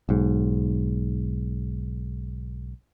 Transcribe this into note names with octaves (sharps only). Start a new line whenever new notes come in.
B1 G#2